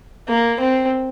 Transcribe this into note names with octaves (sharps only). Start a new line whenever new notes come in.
A#3
C4